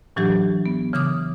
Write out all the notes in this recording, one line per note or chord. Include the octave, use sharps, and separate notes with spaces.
A2 E3 F#3 D4 G4
B3
C#3 E3 D6 D#6